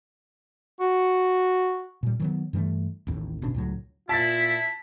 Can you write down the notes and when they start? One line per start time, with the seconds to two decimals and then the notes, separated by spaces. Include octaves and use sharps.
0.80 F#4
2.03 A#2 G3
2.20 D#3 F#3 B3
2.53 G2 E3 G3 A3
3.07 A1 D#2 A2
3.42 G1 B2 C#4 D4
3.54 C#2 A2 F#3
4.09 A#2 E4 F4 A5 A6 B6